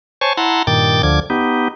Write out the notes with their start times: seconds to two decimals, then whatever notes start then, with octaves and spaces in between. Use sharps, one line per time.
0.21 C5 C#5 G#5 A5 C#6
0.37 E4 F#5 A5 A#5 C6
0.67 G2 A#2 D#3 G5 D6 A6
1.03 D2 D3 F3 D6 G#6
1.30 B3 D#4 G4